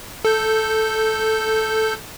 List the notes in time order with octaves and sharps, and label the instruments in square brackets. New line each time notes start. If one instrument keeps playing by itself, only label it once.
[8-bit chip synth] A4 G6